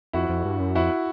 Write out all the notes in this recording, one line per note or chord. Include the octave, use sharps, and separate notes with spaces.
F2 E4 F#4
F2
G2
F#2
F2 E4 F#4